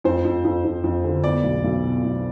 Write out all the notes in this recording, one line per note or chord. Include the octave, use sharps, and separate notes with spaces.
F2 C5
F2
F2
F2
F2
D3
B3 D5
B1
B1
B2
B1